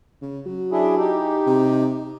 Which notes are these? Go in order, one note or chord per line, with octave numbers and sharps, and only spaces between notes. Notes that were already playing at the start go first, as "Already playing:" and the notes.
C#3
F#3
D4 E4 G#4
D#4 G4
C3